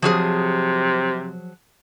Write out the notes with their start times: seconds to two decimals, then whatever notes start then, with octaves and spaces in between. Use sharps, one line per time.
0.02 C3 F3 F#3 G#4